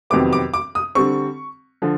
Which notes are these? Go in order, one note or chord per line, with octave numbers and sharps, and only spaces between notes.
F2 C3 D#3 F#3 B3 D6
D6
D6
D#6
D3 G3 C4 C#6
D3 F3